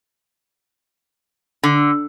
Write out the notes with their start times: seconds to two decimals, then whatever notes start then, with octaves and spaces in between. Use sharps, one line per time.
1.63 D3